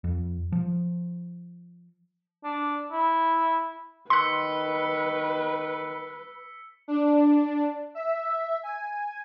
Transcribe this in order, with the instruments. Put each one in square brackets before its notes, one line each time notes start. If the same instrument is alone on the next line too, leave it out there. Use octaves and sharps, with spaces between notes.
[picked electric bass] F2
F3
[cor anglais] D4
E4
[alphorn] D#3 [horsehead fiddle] B4 [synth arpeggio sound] C6 F#6 [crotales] E6 B6 C#7
[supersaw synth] D4
E5
G#5